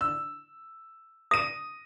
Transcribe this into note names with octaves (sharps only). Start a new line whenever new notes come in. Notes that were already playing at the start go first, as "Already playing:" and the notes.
E6
D#6 A#6 D#7